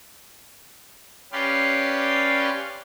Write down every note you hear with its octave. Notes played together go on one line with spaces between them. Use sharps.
C#4 G4 B4 D5 F5 C6